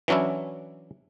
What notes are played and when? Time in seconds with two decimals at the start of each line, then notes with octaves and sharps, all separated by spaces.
0.08 E3 F#3 C#4 D4 E4